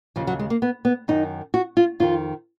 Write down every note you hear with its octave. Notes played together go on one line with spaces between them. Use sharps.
D#2 C#3 F3
F#3
G#3
A#3
B3
B3
F#2 D#3 D#4
F#4
F4
F2 D#3 F4